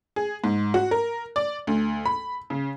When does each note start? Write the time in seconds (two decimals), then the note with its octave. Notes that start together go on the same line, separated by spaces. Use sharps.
0.16 G#4
0.44 G#2
0.74 F#4
0.91 A#4
1.36 D5
1.67 D2
2.06 B5
2.50 C#3